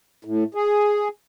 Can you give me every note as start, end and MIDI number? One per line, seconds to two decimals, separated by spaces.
0.25 0.44 45
0.55 1.08 68